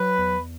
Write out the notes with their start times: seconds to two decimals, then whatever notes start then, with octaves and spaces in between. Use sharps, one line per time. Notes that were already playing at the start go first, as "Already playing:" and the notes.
Already playing: F#3 B4
0.18 E2